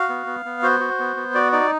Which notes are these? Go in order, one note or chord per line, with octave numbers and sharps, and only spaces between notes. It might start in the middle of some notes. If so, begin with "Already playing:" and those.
Already playing: F#4 F5
B3
B3
B3
F#4 C5
F#4
B3
B3
F#4 D5
D#4 D5